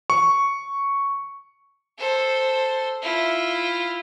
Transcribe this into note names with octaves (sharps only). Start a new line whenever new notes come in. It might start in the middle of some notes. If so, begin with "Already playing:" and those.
C#6
A4 C5
E4 F4